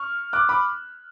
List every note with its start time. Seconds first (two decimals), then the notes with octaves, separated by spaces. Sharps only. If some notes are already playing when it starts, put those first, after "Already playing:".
Already playing: C#6 F6
0.33 D6 F#6
0.49 B5 D6